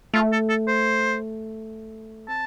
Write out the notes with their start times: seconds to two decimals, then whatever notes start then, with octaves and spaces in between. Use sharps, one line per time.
0.14 A3 F4
0.33 A4
0.50 A4
0.68 C5
2.28 C4 A5